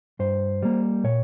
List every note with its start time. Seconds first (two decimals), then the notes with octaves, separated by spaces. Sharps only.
0.19 G2 C5
0.63 G3 A#3
1.04 A#2 C#5